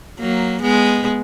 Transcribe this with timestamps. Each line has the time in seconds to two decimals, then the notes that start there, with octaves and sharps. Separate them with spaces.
0.19 F#3 A#3
0.62 G#3 B3